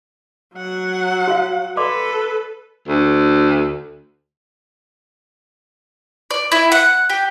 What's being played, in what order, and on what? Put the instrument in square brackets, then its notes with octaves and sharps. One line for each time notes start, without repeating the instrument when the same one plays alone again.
[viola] F#3 F#5
[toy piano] F#4 C#5 F5
[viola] A4 B4 [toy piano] D5 C6 D6
[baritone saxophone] D2
[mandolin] D5
E4
F#5
G4